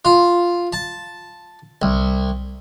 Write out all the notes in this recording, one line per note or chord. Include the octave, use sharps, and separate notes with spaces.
F4
A5
C2